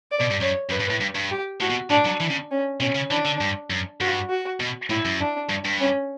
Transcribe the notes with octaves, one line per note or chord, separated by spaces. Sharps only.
D5
B2
G2
F#2 C#5
F#2 B4
G2
A2
G2
G2
G4
A2 F#4
B2
A2 D4
F#3
E3
C#3
C#4
B2 C#4
C#3
E3 D4
D3
G2
F#2
G2 F#4
F#4
B2
A2 E4
F#2
D4
G2
G2
C#4